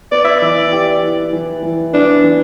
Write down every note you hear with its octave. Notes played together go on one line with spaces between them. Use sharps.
B3 D5
E5
E3 D5
G4
E3
E3
E3
B3 D4
E3